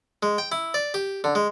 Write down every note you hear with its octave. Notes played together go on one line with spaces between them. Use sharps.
G#3
G5
E4
D5
G4
D3
G#3